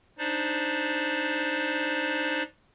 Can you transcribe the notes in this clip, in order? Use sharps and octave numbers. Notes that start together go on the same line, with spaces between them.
D4 D#4 C5 D5